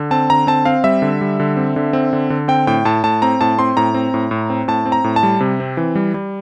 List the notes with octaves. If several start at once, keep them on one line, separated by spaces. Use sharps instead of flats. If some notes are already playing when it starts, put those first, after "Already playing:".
Already playing: D3
C4 A5
D3 A#5
C4 A5
C4 F5
G3 E5
D3
G3
D3
C4
D3
C4
D3
D3
C4 G5
A2 G5
A2 A5
A2 A5
C4 A#5
A2 A5
C4 C6
A2 A#5
C4
A2
A2
C4
A2 A5
C4
A#5
A2
A5
G3
C3
C4
E3
G3
G3